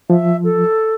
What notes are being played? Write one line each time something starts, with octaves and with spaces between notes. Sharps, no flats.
F3 E5
A4